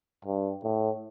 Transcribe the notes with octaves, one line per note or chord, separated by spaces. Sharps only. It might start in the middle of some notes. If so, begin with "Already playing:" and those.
G2
A2